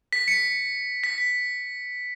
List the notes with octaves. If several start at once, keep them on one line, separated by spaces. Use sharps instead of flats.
B6
C#7
B6
B6